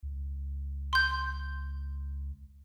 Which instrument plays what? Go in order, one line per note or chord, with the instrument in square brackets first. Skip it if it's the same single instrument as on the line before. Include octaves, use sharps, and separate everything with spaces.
[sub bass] C#2
[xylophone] C6 G6